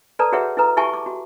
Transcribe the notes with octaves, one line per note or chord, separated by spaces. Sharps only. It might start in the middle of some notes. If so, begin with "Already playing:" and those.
A4 B4 D5 A5 A#5
F#4 G#4 B4 C#5 E5 F#5
E4 A4 B4 A#5
E4 G4 E5 G#5 A5 C#6
D6
F#4